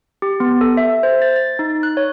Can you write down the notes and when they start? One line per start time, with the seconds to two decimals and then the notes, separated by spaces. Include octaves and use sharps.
0.22 G4
0.40 B3
0.61 A4
0.77 E5
1.03 C5
1.22 A6
1.36 A6
1.59 D#4
1.83 F#6
1.97 C#5